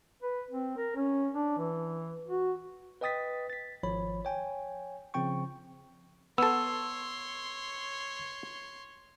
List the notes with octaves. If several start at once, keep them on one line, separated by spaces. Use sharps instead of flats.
B4
C4
A#4
C#4
D4
E3
F#4
B4 D#5 G5 D#6 A6 B6
A6 B6
G#1 F3 C#5 B5
C#5 G5 G#5
C#3 F3 C4 G5 C#6
B3 A4 C#5 C6 E6